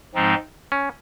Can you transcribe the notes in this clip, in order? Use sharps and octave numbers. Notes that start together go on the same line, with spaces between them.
G#2 F3 G#3 C4 D#4
C#4